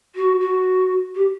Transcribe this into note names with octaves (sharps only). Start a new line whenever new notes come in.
F#4
F#4
G4